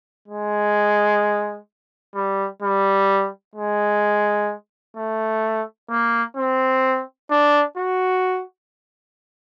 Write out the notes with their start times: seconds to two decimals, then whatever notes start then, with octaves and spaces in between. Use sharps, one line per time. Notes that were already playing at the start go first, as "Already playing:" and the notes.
0.28 G#3
2.15 G3
2.63 G3
3.55 G#3
4.96 A3
5.90 A#3
6.37 C4
7.31 D4
7.77 F#4